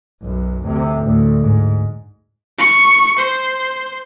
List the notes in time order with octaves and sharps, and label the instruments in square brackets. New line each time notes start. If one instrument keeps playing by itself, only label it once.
[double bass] B1 F#2
D2 C3
D2 A2
G#2
[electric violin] C#6
C5